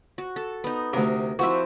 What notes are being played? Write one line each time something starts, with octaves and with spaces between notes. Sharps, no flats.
F#4
A4
B3 D#4
D2 C3 A#4
F3 C4 E4 F#4 E5